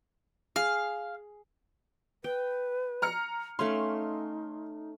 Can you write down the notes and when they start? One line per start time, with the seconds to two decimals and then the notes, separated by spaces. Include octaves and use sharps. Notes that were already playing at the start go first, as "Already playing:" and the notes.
0.56 G#4 F5
2.24 B4 G5
3.02 A#5 F6 C#7
3.59 A3 C#4 D#4 F5 C6